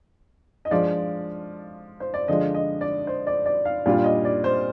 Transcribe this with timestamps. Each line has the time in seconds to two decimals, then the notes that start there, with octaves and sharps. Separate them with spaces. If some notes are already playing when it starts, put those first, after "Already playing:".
0.65 D#5
0.70 F3 G#3 D4 F4 D5
2.00 C5
2.14 D5
2.28 D3 F3 G#3 D4 D#5
2.54 D#5
2.81 D5
3.07 C5
3.27 D5
3.46 D5
3.65 F5
3.86 A#2 G3 D4 F4 F5
4.04 D#5
4.25 D5
4.44 C5